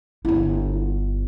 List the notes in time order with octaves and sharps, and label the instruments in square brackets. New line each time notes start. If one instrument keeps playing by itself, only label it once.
[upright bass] G1 E4